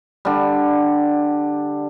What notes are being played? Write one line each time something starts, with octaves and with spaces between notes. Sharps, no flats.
D3 G3